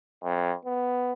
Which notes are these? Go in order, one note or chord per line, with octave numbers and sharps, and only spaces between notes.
F2
B3